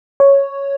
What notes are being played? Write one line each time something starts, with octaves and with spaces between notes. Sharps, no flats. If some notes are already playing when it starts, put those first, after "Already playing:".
C#5